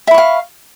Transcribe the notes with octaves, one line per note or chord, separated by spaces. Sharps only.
E5 F5 B5 C#6